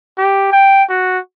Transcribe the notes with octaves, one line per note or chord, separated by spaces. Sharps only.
G4
G5
F#4